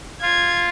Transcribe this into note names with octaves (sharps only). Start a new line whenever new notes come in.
F4 G#6